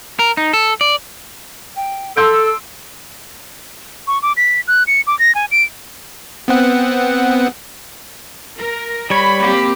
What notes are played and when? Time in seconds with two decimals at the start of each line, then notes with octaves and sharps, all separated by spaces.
0.19 A#4
0.37 D#4
0.53 A4
0.81 D5
1.76 G5
2.17 A4 C6 E6 G6 D7
4.07 C#6
4.22 D6
4.37 B6
4.68 F#6
4.87 C#7
5.07 D6
5.19 A#6
5.35 G#5
5.51 D7
6.48 B3 C4 F#5
8.57 A#4
9.10 G3 C#5 B5
9.41 A#3 C4 G4